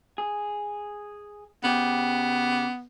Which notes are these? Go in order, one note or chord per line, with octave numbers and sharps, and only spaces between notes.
G#4
C#3 B3 G4